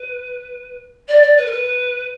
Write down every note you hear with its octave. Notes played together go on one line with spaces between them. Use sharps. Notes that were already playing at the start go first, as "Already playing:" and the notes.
Already playing: B4
D5
D5
B4
A#4
B4